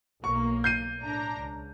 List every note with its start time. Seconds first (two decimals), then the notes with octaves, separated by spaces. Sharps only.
0.24 B1 A#3 C#6
0.64 G6 C7 D#7
1.01 A2 D4 A#5
1.38 C#2